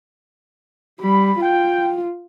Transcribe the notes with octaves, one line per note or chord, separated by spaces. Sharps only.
G3 B5
F4 G5